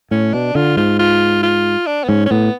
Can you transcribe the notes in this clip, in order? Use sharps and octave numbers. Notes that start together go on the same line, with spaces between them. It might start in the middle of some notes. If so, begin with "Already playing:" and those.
A2 C#4
B2 D4
D3 F4
G#2 F4
F4
F4
D4
B3
G#2 C#4
C#4
A2 B3